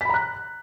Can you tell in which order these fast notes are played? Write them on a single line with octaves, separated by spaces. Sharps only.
B6 B5 A#5 F#6